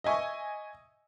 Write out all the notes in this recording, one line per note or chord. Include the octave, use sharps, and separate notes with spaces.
D#5 E5 G#5 C#6